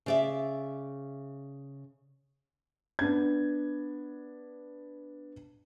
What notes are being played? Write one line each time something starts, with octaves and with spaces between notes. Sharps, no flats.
C#3 D5 E5
B3 D4 G#6